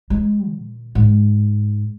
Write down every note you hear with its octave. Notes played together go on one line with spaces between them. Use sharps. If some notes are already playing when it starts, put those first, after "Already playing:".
G#3
A#2
G#2